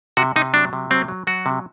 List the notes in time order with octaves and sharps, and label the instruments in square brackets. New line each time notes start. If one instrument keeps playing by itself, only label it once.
[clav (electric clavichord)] C3 F#4
C3 D#4
F#3 D4
C3
F#3 C4
F#3
F#3 F#4
C3